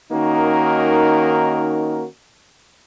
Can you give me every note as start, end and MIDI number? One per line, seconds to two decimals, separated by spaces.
0.12 2.05 51
0.12 2.05 58
0.12 2.05 61
0.12 2.05 63
0.12 2.05 66
0.12 2.05 70